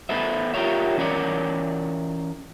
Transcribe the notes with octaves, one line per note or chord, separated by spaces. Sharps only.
B3 A4 B4 C5 E5
F4 G4 A4 A#4 C#5 E5
E3 C#4 A#4 C#5 D5